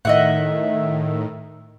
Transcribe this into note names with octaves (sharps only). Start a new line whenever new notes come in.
A2 D#3 D#5 E5 F#5